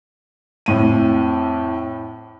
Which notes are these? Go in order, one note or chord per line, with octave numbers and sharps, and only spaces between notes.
F2 A2 D#7